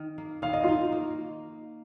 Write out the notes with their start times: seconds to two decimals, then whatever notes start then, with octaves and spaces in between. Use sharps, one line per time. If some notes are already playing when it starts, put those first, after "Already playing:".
Already playing: D#3
0.18 A#3
0.42 D#3 F5
0.53 D#5
0.64 D#4 F4 F5
0.92 A#3